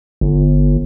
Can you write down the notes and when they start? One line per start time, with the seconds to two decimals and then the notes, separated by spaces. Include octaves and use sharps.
0.21 G1